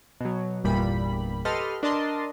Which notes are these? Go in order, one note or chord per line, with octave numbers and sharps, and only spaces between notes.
B2 F#3
G1 E2 A#2 G3 B5
G4 A4 B4 D#5 C6 F6
D4 A#4 D#5 A5 C6